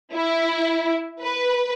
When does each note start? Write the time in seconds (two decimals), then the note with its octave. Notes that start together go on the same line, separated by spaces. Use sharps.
0.15 E4
1.21 B4